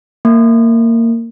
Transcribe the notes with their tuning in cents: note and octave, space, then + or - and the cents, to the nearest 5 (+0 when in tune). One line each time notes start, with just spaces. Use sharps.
A#3 -20